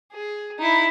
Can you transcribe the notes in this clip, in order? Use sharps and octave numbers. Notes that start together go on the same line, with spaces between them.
G#4
D#4 E4